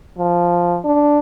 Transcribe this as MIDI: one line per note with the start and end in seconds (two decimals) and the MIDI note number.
0.18 0.78 53
0.84 1.19 62